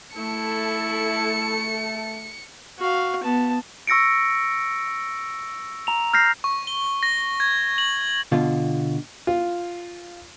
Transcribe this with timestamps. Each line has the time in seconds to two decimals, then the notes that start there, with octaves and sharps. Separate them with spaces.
0.15 A3 E4 A4 C#7
2.79 F#4 F5
3.23 B3 A5
3.87 C#6 E6 A#6 C#7 D7
5.87 A#5 F7
6.14 F6 G6 A#6 C7
6.44 C#6
6.67 G7
7.03 A#6
7.40 G#6
7.78 F#7
8.32 B2 D3 F4
9.27 F4